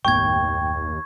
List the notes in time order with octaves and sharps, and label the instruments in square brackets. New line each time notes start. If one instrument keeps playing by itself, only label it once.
[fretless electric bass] F#1 A2 B3 [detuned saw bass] D#2 [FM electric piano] G5 [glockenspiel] C#6 G#6